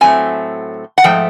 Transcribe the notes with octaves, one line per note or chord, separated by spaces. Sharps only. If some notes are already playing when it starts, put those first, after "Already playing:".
A2 F#3 A3 C4 G#5
F#5
G#2 F3 A3 G5